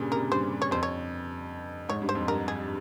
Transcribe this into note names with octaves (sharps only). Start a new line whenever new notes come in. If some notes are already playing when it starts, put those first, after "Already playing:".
Already playing: G2 A#2 C#3
C3 A#4
G2 C5
C#5
F2 C5
C#5
G#2 C#5
G2
C5
F2
G2 A#4
G#4